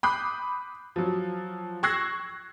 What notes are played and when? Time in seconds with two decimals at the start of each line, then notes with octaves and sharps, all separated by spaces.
0.03 B5 D6 D#6 F#6 G6 C7
0.96 F3 F#3
1.83 C#6 E6 F#6 G#6 A#6 C7